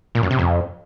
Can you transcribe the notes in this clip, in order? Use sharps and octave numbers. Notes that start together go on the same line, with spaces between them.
A#2
F#2
C3
F2